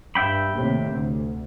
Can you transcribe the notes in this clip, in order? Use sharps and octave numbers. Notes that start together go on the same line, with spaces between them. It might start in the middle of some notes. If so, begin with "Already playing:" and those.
G2 E5 G5 B5
D#2 A2 C3
D2